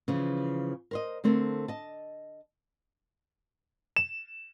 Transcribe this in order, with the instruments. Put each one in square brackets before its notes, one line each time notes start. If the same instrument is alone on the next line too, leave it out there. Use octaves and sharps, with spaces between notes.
[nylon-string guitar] C#3 E3 F3
A#4 C5 D#5
D3 A3 C4 A4 A#4
D#5 A5
[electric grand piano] E7